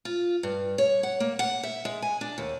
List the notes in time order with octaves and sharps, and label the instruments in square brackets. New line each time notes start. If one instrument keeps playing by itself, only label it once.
[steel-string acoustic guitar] F4
G2
C#5
F#5
A#3
F#5
E5
G#3
G#5
D4
D#2